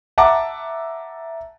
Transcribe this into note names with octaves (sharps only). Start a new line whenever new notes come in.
E5 F#5 A5 A#5 D6